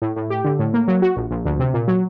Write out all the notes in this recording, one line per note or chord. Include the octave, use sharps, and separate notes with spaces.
A2
A2
G4
D3
A2
A#3
F#3
F#4
A#1
A#1
D2
C3
A#2
F#3